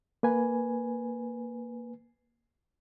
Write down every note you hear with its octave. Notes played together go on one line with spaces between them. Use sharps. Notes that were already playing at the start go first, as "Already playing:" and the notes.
A#3 B4 G#5